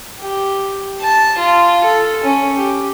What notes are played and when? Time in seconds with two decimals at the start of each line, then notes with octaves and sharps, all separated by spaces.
0.21 G4
1.01 A5
1.38 F4
1.84 A4
2.24 C#4
2.56 G4